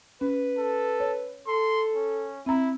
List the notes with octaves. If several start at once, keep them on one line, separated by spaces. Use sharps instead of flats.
C#4 B4
A4
C#5
A4 C6
C#4
C4 E4 A#5